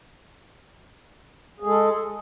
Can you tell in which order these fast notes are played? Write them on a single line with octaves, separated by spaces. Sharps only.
G#4 G#3 A4